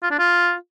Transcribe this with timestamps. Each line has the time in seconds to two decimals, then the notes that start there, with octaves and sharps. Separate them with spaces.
0.03 F4
0.11 D4
0.19 F4